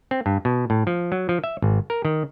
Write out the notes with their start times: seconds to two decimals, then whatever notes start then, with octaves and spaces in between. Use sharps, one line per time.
0.11 C4
0.26 G2
0.45 B2
0.70 A2
0.87 F3
1.12 F#3
1.29 F3
1.44 E5
1.62 G#1
1.90 A#4
2.05 D#3